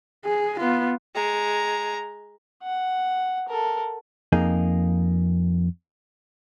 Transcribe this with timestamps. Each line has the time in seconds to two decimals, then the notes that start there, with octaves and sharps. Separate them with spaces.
0.25 G#4
0.60 B3 F4
1.15 G#3 A#5
2.63 F#5
3.48 A4 A#4
4.33 F2 A#3 D#4 G#4